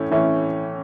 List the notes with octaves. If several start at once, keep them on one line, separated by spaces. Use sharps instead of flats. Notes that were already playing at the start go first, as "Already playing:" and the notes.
Already playing: A2 E3 A3 C#4 E4
A2 E3 A3 C#4 E4